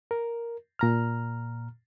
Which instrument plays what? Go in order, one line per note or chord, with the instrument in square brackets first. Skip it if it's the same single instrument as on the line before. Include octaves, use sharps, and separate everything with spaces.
[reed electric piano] A#4
A#2 A#5 F6